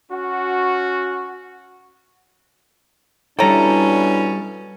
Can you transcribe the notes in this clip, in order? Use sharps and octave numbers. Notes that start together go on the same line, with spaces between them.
C#4 F#4
B2 G3 C#4 D4 E4 A4 G5 A#5